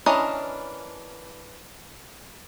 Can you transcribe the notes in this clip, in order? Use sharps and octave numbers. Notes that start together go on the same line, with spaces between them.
E3 C#4 D4 A#4 D#5